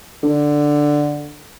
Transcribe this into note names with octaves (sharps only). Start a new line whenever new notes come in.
D3